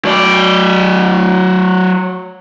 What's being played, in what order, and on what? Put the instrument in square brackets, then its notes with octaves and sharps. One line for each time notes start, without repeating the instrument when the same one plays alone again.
[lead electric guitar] F#3 D5